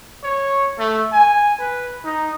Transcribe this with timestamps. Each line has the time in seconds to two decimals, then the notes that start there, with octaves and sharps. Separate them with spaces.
0.23 C#5
0.79 A3
1.13 G#5
1.60 B4
2.05 D#4